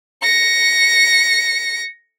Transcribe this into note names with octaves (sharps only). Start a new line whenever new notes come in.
A#6 C#7